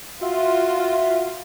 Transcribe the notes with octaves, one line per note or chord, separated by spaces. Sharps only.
F4 F#4 E5